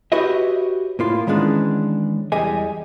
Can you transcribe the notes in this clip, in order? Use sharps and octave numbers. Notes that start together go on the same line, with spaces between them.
F#4 G4 B4 C#5 D#5 E5
A2 A#3 F4
D#3 E3 G#3 B3 C#4 D4
E2 G3 G4 G#4 D#5 G#5